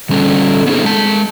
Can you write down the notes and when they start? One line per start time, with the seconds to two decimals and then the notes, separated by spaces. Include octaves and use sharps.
0.09 D3 G3 C#4 A4
0.66 B3 C4 D#4 G#4 A4
0.84 G#3 A5